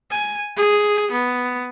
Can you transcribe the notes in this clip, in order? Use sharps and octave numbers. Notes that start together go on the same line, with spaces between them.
G#5
G#4
B3